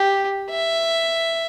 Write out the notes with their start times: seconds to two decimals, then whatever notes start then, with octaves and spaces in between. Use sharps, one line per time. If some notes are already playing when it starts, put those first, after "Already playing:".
Already playing: G4
0.51 E5